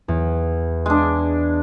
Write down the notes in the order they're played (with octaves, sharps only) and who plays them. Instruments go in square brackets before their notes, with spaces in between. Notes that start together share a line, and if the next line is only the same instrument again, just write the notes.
[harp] E2
[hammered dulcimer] G#3 D4